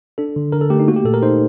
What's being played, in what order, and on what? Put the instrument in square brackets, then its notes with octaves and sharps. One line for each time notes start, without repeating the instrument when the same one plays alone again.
[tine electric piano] D4 A4
D3
D3 A#4
A4
A3 G4
D#4
A#3 F#4
G4
A#2 A4
A#4
D#4 C5